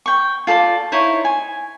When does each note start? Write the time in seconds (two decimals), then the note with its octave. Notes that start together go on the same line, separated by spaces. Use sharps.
0.06 G5 C#6
0.47 F4 A4 D5 A5
0.92 D#4 E4 C5 C#5
1.25 G#5